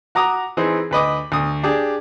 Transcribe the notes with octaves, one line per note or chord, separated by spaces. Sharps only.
F#4 A#5 D6 D#6
E3 C4 D#4 G#4 C5
D2 B4 D#5 D6
D2 D#6
D4 G4 G#4